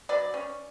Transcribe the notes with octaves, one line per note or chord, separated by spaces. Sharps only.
F#3 B4 D5
C#4